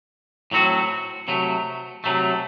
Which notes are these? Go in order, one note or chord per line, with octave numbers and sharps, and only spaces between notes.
A2 F#3 C4 F#4
C3 F#3 A3
C3 F#3 A3